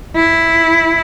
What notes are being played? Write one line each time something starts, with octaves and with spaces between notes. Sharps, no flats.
E4